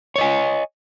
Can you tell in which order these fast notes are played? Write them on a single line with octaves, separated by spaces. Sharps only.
C#5 D#5 G#5